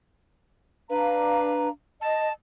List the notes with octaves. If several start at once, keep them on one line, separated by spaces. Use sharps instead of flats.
D4 B4 F5 A#5
D#5 A5